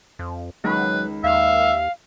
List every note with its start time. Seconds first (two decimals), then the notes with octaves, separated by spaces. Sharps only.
0.19 F2
0.64 C#2 D#3 F#3 B4 B5
1.24 D#2 E5 F5